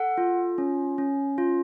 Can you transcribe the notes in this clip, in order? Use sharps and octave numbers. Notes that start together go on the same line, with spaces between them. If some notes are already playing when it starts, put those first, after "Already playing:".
Already playing: A4 F#5
F4
C#4
C#4
F4